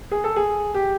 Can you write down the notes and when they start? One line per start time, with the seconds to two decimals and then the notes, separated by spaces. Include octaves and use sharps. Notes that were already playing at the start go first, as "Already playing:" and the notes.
0.11 G#4
0.24 A4
0.36 G#4
0.74 G4